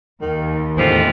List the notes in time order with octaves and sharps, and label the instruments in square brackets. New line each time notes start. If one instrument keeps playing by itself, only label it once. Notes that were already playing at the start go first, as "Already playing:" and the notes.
[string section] D#2 [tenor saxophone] D#3
[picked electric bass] E2 A2 D3 [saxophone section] G3 G#3 F4 [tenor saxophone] C5